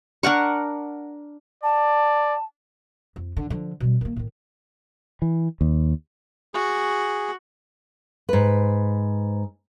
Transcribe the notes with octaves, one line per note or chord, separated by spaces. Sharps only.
D4 A#4 F#5 C#6
D5 A5
F2
D3
D3 F3
B2 G3
D#3 A#3
A2 D#3
E3
D#2
F#4 G#4
G#2 B4